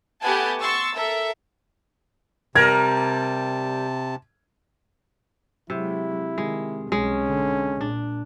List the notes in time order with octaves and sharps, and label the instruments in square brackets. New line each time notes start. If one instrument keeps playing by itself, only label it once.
[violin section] A3 B3 G4 F#5 G#5 A5
C6 C#6 E6 A6
A4 A#4 E5
[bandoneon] C3 A5 [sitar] G3 A#4 [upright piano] G#6
[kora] C3 [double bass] F#3 G#3 [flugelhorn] E4
[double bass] D#3 [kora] G#3
[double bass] B1 [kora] G#3 [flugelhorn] C#4
[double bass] D3
[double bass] A#2 [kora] D4